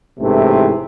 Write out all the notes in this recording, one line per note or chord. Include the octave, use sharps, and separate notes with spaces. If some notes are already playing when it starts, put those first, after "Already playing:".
A1 G#2 C3 E3 A3